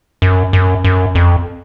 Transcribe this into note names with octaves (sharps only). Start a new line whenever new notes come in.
F#2
F#2
F#2
F2